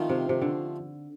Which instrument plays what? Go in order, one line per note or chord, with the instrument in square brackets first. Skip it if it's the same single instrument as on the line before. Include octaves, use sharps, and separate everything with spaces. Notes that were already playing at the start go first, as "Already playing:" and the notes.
Already playing: [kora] D#3 [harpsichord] F3 A3 C4 F4
[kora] C3
C3
D3